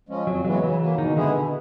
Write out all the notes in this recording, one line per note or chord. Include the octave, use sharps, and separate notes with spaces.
F3 G#3 C#4
F2 F#3
C#3 E3 F#3 G#3 B3
C#3 E3
F#3 A#3
B2 D#3
D3 G#3 B3 E4 G#4
B2